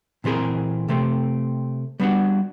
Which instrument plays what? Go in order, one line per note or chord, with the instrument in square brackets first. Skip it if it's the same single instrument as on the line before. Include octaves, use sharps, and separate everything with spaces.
[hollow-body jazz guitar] A#2 E3 C4 G#4 A#4
C3 A3 C4
G3 B3 D4 F#4 F#5